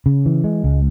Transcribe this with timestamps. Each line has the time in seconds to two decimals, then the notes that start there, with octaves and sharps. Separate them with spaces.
0.06 C#3
0.26 E3
0.44 G#3
0.64 C#2